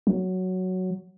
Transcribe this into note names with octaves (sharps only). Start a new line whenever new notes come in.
F#3